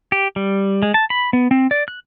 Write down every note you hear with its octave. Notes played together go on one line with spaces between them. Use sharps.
G4
G3
G#3
A5
B5
B3
C4
D5
F#6